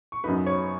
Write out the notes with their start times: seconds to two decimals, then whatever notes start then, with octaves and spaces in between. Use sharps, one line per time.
0.12 C#6
0.24 F#2 F#3 D#4 B4 B5
0.46 C#5 C#6